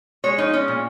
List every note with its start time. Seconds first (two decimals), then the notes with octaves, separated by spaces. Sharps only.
0.24 G#3 C#5
0.38 F3 D#4
0.53 G#3 C#4
0.68 A#2